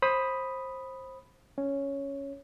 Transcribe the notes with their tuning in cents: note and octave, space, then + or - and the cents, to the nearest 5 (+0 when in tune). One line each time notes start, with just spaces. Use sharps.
C5 +20 B5 +0 D#6 +0
C#4 +0 C#5 +0